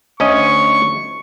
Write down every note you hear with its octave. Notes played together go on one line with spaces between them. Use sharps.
D2 C#4 D#5 C#6